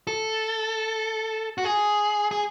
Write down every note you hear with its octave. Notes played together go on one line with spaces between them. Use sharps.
A4
F#4
G#4
G#4